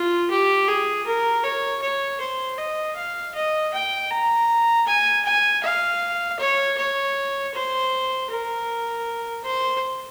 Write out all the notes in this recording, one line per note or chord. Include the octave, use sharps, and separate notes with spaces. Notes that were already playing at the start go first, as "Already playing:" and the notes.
Already playing: F4
G4
G#4
A#4
C#5
C#5
C5
D#5
F5
D#5
G5
A#5
G#5
G#5
F5
C#5
C#5
C5
A#4
C5